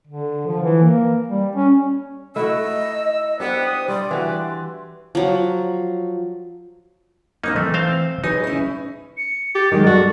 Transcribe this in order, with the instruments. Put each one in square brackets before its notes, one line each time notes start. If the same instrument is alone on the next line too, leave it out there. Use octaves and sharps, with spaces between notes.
[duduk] D3
F3
E3
A#3
G3
C#4
[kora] A3 E4 F#4 [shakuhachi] D#5 [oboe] E6
[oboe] B3 [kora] D4 G4 F#5 [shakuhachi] C5
[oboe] D#6
[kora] G3 [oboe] D5 [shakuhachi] C6
[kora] E3 F#4 G4
[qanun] F3 F#3
[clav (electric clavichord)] A#3 D#4 [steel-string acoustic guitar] C4 D4 D#5
[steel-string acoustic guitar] E3 [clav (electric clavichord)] A3
[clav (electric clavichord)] C4 C5 F5
[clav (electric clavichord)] D#4 [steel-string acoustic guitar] G#4 B4 C#5
[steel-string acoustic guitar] C#4 E4
[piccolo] C#7
[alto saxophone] G4 [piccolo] A6
[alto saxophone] D#3 [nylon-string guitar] F#3 G#3
[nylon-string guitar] G3 A4 [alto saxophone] F#4